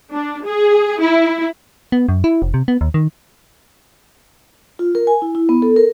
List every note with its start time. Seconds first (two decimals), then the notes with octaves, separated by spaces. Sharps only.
0.13 D4
0.45 G#4
1.01 E4
1.92 B3
2.09 F#2
2.24 E4
2.42 F1
2.54 C3
2.68 B3
2.81 D#2
2.94 D#3
4.79 F4
4.95 A#4
5.07 G#5
5.22 E4
5.35 E4
5.49 B3
5.62 A4
5.76 A#4